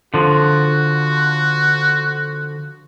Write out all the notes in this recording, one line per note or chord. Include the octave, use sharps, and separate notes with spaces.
D3 F3 F#4